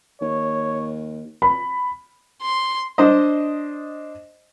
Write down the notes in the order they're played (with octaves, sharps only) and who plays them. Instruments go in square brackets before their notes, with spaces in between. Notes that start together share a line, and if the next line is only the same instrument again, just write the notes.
[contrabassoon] D#2 [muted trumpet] C#5
[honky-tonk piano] B5
[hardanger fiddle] C6
[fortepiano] D4 C5 D#5